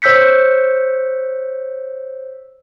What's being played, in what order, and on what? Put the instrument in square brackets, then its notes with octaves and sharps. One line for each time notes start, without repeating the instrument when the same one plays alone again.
[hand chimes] C5 C#5 E6 G6 B6 C#7